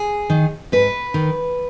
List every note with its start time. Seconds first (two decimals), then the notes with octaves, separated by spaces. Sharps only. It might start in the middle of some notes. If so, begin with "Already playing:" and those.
Already playing: G#4
0.30 D#3
0.72 G#2 B4
1.14 D#3